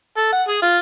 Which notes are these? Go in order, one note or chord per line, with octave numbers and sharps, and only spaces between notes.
A4
F#5
G#4
F4